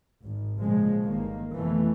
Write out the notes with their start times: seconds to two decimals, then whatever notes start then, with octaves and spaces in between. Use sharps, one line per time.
0.23 G#1
0.63 A#2 C#3 F3 G#3
1.04 G1 D#3 A#3
1.53 F2 B2 E3 A3